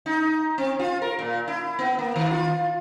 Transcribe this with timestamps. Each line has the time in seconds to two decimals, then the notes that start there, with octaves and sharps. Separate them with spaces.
0.06 D#4
0.58 C4
0.79 F4
1.02 A#4
1.19 A#2
1.48 E4
1.79 B3
1.99 A#3
2.16 D#3
2.31 F4